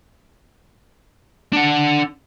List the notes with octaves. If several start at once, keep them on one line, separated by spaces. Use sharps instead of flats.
D4 F#5